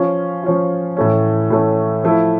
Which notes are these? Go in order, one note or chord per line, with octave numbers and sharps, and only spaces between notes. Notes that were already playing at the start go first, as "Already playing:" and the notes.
Already playing: F3 C#4 F4
F3 C#4 F4
A2 E3 A3 C#4
A2 E3 A3 C#4
F3 A3 E4